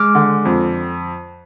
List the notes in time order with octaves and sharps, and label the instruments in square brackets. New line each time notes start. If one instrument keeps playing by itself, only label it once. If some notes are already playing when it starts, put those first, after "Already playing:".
Already playing: [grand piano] G#3 [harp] D6 F6
[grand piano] D3
F2